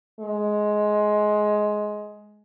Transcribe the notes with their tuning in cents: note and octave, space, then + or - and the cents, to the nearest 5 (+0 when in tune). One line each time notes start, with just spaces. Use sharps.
G#3 +15